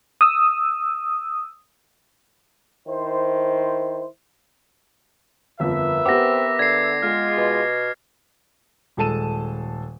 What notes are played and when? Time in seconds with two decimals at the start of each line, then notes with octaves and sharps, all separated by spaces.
0.21 D#6 E6
2.88 D#3 E4 C5
5.60 G1 F2 A#4 B4 E5
6.05 B3 C4 G4 F#5 D6 A#6
6.59 D3 G#6 C7
7.02 G#3 F4 F6
7.37 B2
8.97 D#1 G#3 A4 A5 D#7 E7